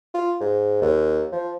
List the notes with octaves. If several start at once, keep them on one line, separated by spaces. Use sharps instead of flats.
F4
G#2
D#2
F3